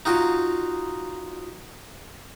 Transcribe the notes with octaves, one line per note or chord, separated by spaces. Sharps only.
D#4 F4 F#4